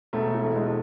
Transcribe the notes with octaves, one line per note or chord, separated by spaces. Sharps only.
E1 A3
E3
A3
E1 G#3
A3